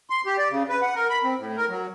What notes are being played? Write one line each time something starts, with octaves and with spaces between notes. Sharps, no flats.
C6
G4
D5
C#3
B4
F#5
A#4
B5
C4
A2
A#4
F#3